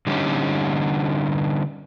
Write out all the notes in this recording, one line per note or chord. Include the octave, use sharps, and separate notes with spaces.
D3 G3 B3 C#4 D#4